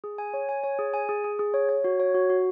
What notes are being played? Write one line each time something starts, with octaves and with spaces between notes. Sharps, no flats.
G#4
G#5
C#5
G#5
C#5
G#4
G#5
G#4
G#4
G#4
C#5
C#5
F#4
C#5
F#4
F#4